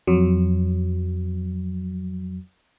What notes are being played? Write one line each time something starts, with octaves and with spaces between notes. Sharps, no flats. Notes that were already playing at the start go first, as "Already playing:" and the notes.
F2 F#3